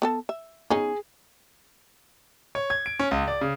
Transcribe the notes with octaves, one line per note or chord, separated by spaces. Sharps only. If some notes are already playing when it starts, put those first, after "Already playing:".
B3 A4 A5
E5
B3 C#4 D#4 G#4
C#5
G#6
D7
C#4
C#2
D5
C#3